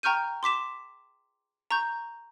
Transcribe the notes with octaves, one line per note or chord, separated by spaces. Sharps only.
G5 A#5 C#6 F6 G6 D#7
C6 D6 B6 E7
A#5 C#6 G6